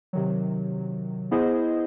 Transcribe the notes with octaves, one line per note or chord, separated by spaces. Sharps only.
C3 D#3 F#3
B3 E4 G#4 C5 D#5